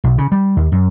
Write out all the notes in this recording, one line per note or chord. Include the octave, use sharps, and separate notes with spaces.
B1
C#3
G3
D#2
F#2